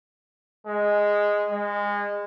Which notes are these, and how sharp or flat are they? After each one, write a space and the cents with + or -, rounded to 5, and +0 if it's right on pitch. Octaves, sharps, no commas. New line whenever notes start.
G#3 -5
G#3 -25